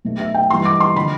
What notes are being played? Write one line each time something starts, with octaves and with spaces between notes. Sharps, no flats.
B1 B2 A3
E5
G5
G2 E3 G3 C6
D6
C6
D3 F3 B5